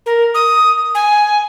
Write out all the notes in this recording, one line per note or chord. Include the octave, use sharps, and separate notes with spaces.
A#4
D#6
G#5